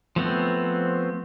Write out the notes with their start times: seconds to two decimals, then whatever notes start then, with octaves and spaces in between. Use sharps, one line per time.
0.16 F3 A3 B3 C4